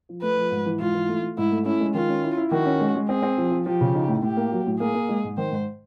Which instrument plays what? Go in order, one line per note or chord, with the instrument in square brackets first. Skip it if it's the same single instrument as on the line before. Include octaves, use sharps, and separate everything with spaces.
[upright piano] F3
[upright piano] A3 [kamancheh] B4
[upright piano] F3
G#2
E3
[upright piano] G#2 [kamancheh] F4
[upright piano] E3
A3
A3
[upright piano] G#2 [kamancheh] E4
[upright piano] A3
[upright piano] C#4 [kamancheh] E4
[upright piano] G#3
[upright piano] D#3 [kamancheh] F4
[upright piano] C#4
E4
E4
[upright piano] D#3 [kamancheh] F#4
[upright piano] C#4
G#3
G#3
[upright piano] C4 [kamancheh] G#4
[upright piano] C4
F3
F3
[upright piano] F3 [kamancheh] G4
[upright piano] C#3
D#4
A2
[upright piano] A2 [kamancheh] G4
[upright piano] A#3
F#3
A2
[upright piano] A#3 [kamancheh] G#4
[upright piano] A#3
G#3
G#2
[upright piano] D#3 [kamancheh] C5
[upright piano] G#2